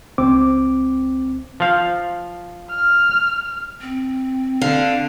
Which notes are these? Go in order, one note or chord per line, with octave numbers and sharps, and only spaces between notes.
C#2 C4 D6
F3 F5
F6
C4
D3 F5